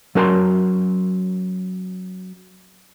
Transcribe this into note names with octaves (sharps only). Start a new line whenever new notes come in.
F#3 C#4 A#4 A5 B5 C6